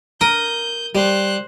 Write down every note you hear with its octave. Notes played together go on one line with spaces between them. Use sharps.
A#4 D#6 G6
G3 C5 F#6